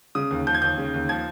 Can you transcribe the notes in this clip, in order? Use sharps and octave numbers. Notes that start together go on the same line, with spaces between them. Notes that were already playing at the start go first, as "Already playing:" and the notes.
C#3 D#6
D#2
F3 G6
G#6
D#2 G6
C#3
D#2
F3 G#6